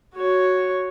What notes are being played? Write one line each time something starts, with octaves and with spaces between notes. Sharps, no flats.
F#4 C#5